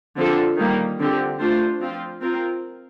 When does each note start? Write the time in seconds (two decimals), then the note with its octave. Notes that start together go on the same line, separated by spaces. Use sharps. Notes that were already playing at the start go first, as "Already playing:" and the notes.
0.17 D3 F3 C4 F4 A4
0.58 D#3 G3 A#3
0.99 D3 F3 C4 G4
1.40 A3 D4 F4 C5
1.81 F3 C4 F4
2.22 C4 F4 A#4